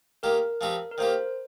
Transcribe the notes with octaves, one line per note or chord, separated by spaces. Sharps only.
D#3 A#3 G4 A#4
F3 C4 D#4 G4
A#4
D#3 A#3 G4 C5